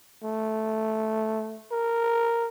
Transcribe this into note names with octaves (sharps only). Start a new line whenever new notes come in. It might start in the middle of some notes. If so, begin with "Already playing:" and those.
A3
A#4